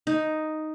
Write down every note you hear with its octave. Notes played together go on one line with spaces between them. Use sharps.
D#4